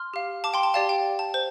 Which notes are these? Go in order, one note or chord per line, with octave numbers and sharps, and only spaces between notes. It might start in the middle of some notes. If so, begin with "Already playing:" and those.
Already playing: C6 F6
G4 F5
A5 D6
G5 C6
A5
G4 D5 F5 A5
G5
A5
C5